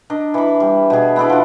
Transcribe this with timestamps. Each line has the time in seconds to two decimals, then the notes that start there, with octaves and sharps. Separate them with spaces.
0.10 D4 A#4 D#5
0.34 E3 B5
0.60 G3
0.90 B2 G#4
1.16 B3 E4 A4 D5
1.30 F3 D4